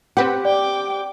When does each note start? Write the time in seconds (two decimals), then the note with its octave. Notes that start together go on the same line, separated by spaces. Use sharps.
0.17 C4 G4 B4 F#5
0.45 D5 G5 D6